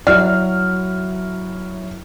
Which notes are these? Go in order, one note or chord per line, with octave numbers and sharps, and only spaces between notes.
F#3 E4 F#4 D5 F6